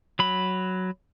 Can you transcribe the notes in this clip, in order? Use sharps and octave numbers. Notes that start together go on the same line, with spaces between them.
F#3 B5